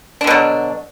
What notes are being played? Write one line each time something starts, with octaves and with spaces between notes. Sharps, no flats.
B2 D3 F#3 D4